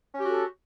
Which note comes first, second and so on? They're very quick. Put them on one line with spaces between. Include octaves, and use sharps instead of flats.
C#4 G4 F#4 A4